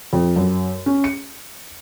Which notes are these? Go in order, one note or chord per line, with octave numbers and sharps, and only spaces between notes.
F2
F#2
C#4
C#7